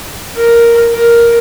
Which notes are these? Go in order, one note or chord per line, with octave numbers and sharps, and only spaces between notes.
A#4
A#4